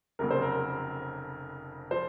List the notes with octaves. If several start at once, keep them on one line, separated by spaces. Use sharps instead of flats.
F1 F2 C#3 F#3 A#3 A#4
C5
A#4
F3 C5